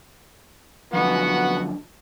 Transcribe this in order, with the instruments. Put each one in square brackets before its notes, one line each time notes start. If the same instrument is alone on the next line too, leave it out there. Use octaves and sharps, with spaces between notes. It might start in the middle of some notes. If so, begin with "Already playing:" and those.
[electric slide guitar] F#2 D3 F3 [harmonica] B3 F#4 F#5